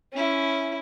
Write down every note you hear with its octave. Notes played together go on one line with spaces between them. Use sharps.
C#4 E4